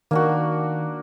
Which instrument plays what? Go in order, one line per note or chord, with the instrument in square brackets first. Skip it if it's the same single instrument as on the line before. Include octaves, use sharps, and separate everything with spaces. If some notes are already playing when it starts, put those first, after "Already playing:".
[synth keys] D#3 [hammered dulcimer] A#3 D4 F#4